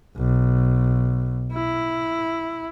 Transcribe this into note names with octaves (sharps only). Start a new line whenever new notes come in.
B1
E4